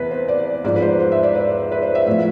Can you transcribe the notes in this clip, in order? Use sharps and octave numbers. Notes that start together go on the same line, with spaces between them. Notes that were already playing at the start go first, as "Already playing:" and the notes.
Already playing: E2 C3 B4
C5
D5
G#2 F3 D5
B4
C5
C5
E5
D5
B4
B4
C5
E5
A2 F3 E5